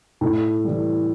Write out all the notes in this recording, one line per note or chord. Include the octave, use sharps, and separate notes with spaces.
A2
E3 G3